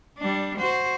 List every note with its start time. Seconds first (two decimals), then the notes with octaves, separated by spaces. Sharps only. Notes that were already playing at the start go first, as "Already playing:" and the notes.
0.18 G3 D4
0.58 F#4 C5